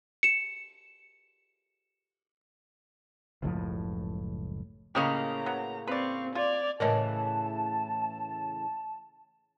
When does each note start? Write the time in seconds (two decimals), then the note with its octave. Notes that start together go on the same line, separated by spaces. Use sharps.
0.23 C#7 E7
3.42 F#1 C#2 A2 F3
4.95 A2 C#3 A#3 C#4 G4 C#5 D#5 A#5
5.46 F#3 B3
5.88 C4 B4 D5 F5 C#6
6.35 F4 D5 G#6 F7
6.80 A2 C#3 E3 A#4 C#5 D#5 A5